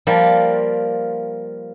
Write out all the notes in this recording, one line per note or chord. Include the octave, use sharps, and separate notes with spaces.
F3 G3 A#3 F4